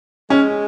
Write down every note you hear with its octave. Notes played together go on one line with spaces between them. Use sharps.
G#3 C#4